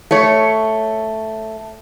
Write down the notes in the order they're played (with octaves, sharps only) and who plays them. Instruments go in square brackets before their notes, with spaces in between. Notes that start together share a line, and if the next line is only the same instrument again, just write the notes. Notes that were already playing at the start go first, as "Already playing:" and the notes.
[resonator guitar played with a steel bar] A3 C#5